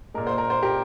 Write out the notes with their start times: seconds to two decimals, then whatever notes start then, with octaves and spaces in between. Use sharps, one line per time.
0.14 A#2 G#3 A#4
0.27 C5
0.38 A#4
0.50 C5
0.63 G4 A#4